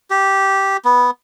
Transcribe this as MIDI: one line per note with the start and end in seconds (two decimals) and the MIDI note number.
0.10 0.77 67
0.85 1.11 59